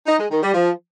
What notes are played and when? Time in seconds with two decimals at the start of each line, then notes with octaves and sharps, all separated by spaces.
0.06 D#4
0.18 G#3
0.30 D#3
0.42 G3
0.54 F3